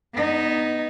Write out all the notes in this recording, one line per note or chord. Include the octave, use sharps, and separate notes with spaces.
B3 D#4